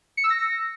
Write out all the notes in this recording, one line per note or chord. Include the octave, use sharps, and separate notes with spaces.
C#7
E6
A#6